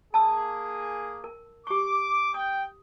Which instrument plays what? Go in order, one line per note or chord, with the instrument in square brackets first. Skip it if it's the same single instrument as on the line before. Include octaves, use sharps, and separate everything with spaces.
[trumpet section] A#3 G#4 [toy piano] A5 E6
[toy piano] A#4
[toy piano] G4 C#6 [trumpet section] D6
[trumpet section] G5 [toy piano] D#6